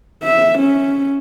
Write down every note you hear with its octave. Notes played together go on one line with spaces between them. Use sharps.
E5
C#4